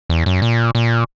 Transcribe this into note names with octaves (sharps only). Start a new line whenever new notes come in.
E2
F#2
A#2
A#2